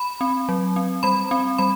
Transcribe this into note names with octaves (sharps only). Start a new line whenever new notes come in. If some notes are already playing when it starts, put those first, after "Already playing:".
Already playing: B5
C4
F#3
C4
G3 B5
C4
G3 B5